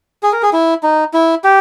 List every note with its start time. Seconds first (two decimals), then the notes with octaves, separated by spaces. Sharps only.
0.23 G#4
0.33 A#4
0.42 G#4
0.53 E4
0.83 D#4
1.14 E4
1.44 G4